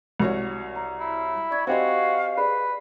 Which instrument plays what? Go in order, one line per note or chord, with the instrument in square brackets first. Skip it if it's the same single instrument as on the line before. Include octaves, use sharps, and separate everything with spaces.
[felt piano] C2 F#4 C#5
[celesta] A#5
[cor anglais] E4
[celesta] D5 C#6 G#6 [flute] B5
[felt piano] C4 G4 C5 [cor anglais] F#4 [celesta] D#5 G#5 C#6 [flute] F5
[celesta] G#4 D5 B5 [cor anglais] B4